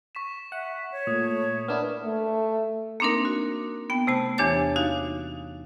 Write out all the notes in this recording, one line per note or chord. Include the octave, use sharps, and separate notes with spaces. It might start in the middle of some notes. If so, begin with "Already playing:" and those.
C#6 B6 E7
E5 F#5
C#5
A#2 A3 D#6
B3 D4 E4 A#4 F6 E7
A3
A#3 C4 D4 D#4 A#4
F#4
B3 G5
C3 A3 A5
E2 E3 D4 G4 C#5 A6
D#4 F#4 F5